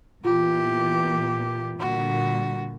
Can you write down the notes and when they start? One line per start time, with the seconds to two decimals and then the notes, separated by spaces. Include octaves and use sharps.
0.25 A#2 E3 B3 F4 G4
1.80 A#2 D3 G3 F#4